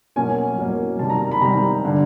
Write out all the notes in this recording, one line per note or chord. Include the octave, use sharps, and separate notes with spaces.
B2 F#3 A#3 C#4 G#5
B2 F#3 A#3 C#4
C3 D#3 G3 A5
A#5
B5
C3 D#3 G3 A#5
D3 G3